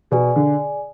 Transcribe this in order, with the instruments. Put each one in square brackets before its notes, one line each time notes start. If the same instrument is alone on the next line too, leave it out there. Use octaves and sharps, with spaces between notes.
[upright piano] B2 [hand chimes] G#4 D5 G#5
[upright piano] D3